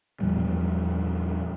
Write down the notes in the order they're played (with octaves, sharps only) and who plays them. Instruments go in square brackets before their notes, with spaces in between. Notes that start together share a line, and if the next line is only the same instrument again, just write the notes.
[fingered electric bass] E2 A#2 F3 G3